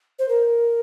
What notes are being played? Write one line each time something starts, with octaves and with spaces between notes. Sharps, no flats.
C5
A#4